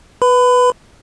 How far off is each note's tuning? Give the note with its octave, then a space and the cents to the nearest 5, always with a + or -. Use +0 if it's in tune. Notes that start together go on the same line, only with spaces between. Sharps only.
B4 +0 B5 +30